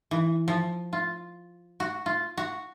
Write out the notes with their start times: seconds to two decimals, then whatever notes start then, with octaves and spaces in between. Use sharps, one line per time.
0.11 E3
0.48 F3
0.93 F4
1.80 F#4
2.06 F4
2.37 F#4